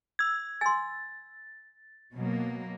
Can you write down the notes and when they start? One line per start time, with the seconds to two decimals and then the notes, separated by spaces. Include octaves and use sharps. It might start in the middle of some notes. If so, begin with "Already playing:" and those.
0.19 E6 G#6
0.61 G#5 C6 A6
2.15 B2 F#3 A#3